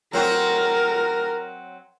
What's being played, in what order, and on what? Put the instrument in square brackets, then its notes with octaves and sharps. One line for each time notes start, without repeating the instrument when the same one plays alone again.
[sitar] F#3 C4 F#4 [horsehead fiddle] A#4